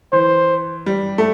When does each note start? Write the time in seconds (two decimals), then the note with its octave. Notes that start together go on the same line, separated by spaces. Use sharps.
0.13 E3 C5
0.86 G3
1.18 A3